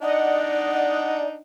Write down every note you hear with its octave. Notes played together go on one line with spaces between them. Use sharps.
D4 D#4 D5 D#5 F#5